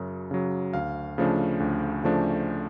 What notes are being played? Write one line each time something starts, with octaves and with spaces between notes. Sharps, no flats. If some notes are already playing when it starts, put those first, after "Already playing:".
Already playing: F#2 C#3 F#3
C#3 F#3
D2 F5
C#3 F3 A3 D4
D2
C#3 F3 A3 D4